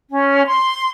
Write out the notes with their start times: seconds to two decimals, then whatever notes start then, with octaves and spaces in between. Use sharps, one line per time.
0.10 C#4
0.46 C6